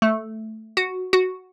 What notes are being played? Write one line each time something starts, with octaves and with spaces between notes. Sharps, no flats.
A3
F#4
F#4